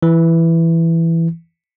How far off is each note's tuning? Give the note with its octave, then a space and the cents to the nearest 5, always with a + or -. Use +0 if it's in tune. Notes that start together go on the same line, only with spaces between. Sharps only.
E3 +5